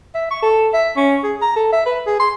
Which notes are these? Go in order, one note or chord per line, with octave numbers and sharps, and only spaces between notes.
E5
C#6
A4
E5
C#4
G#4
A#5
A4
E5
B4
G#4
C6